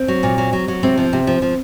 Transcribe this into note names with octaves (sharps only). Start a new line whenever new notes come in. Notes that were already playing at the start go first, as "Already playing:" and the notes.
Already playing: C4
F#3
A#2
F#3
F#3
F#3
C3 C4
F3
C3
F3
F3